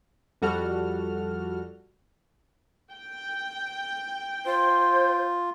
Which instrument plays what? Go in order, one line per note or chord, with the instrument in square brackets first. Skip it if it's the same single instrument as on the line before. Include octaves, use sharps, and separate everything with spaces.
[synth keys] F2 G3 F#4 A4 F6
[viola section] G5
[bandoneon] F4 [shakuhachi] C5